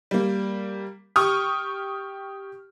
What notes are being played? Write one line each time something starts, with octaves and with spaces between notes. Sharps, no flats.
G3 A#3
G4 C#6 D#6 F6